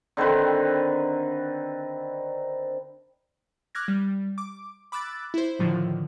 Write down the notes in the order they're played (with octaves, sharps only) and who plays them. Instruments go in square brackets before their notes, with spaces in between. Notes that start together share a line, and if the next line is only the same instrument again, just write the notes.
[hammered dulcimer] D3 D#3 C4 B4
[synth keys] D6 F6 F#6 G#6 A#6
G3
D6
B5 D6 E6 F#6 A6
E4 C5
A2 D3 D#3 F3